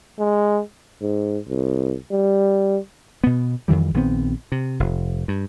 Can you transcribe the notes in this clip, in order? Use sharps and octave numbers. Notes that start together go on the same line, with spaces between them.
G#3
G#2
C2
G3
B2 B3
F2 D#3 E3 G3
A#1 D#3 B3 C4
C3
F1
G2